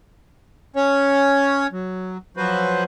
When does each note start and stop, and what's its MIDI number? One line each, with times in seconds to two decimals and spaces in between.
0.76 1.67 61
0.76 1.67 73
1.72 2.18 54
2.37 2.84 53
2.37 2.84 54
2.37 2.84 66
2.37 2.84 71
2.37 2.84 72